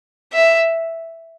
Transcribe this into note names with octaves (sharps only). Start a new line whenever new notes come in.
E5